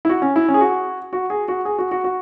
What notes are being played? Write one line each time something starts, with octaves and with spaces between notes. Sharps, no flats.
E4
F#4
C#4
E4
C#4
G#4
F#4
F#4
G#4
F#4
G#4
F#4
F#4
F#4